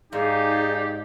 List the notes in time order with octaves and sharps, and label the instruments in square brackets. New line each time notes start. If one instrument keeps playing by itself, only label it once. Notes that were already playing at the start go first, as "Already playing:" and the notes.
[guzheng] G#2 [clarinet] D#4 [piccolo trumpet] G4 [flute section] G#4 D5 F5